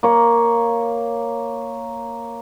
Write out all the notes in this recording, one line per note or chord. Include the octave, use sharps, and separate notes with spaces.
A#3 C#5